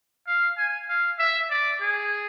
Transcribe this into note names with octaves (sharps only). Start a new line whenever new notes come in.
F5
G#5
F5
E5
D5
G#4